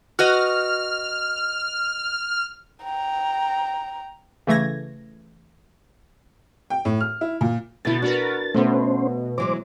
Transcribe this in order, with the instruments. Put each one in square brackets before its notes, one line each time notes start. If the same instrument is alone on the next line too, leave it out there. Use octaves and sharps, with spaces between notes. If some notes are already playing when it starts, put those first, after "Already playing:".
[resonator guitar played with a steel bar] F#4 B4 D#5 [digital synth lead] F6
[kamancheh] G5 A#5
[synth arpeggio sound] C#3 E3 A3 G#6 A#6
[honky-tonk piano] G5
A2
F6
E4
A#2
[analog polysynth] B2 B3 [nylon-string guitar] D3 E4 [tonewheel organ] A6
[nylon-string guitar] D4 [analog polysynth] F#4 A#4 B4
[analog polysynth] B2 [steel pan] A3 B3 [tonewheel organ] C#4 C5
[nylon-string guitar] E3 F#3 G#3 [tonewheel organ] C5 D6